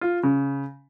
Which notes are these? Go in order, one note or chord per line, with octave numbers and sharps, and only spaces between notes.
F4
C#3